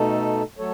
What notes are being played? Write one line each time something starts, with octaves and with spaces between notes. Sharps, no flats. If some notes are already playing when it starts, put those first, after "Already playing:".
Already playing: B2 A3 D#4 A4
F#3 A3 A4 C#5